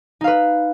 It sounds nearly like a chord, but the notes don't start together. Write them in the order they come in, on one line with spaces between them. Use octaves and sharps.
D#4 F5 B4